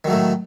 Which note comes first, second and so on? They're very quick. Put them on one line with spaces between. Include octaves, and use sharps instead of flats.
D#3 F#3 A3 A2